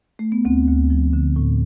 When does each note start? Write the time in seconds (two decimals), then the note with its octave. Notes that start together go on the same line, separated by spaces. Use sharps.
0.19 A3
0.32 B3
0.45 D2 C4
0.67 D2
0.90 F3
1.13 D3
1.36 A2